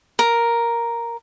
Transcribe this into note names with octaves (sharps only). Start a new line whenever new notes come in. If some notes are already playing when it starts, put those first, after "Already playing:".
A#4